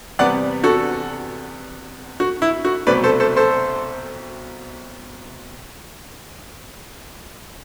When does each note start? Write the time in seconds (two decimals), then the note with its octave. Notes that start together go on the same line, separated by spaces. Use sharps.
0.19 E2 C3 G3 B3 D5 F#5
0.64 F#4 A4
2.20 F#4
2.42 E4
2.65 F#4
2.87 C2 B2 F#3 A3 C4 B4 D5
3.04 A4 C5
3.20 A4 C5
3.37 A4 C5